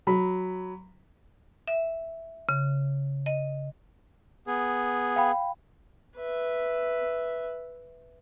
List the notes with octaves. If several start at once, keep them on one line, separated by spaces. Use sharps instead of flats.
F#3 B5
E5
C#3
D#5
B3 G#4
F5 G5 B5
B4 E5